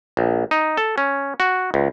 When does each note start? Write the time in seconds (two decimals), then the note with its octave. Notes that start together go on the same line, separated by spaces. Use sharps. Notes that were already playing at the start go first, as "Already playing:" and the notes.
0.17 A#1
0.51 D#4
0.77 A4
0.98 C#4
1.40 F#4
1.74 C#2